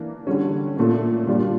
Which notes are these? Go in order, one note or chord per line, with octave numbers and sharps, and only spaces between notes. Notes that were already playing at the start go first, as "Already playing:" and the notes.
Already playing: E3 A#3 D4
D3 G3 C#4
A#2 A3 C#4
A#2 G3 D4 F4